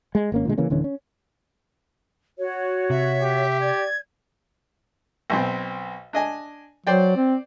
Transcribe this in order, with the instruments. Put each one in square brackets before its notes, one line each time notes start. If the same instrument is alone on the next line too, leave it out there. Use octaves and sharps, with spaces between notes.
[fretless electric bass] G#3
G#1 A#3 C#4
A#2 D3 G#3
C#3 E3 A#3 C#4
D1 D3 E3 C#4
C#4
[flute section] F#4 C#5
[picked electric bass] C3 [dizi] E5
[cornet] G4
[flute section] D5 [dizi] G#6
[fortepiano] B1 B2 C4
D4 D#5 G#5
[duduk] F#3 [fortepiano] C5 D5 G5
[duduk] C4